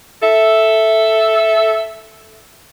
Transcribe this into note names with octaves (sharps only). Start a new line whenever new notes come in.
A4 E5